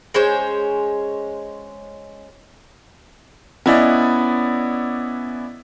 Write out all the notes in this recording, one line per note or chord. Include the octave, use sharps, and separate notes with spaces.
G#3 C#4 C5 C#5
B3 C#4 E4 D5 D#5